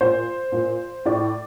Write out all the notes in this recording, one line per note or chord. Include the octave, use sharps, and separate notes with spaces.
A#2 C5
A#2
A2 D5